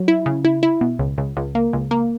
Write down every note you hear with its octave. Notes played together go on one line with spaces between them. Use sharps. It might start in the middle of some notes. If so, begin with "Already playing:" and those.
Already playing: F#3
E4
C#3
E4
E4
B2
C#2
C#2
C#2
A#3
C#2
A#3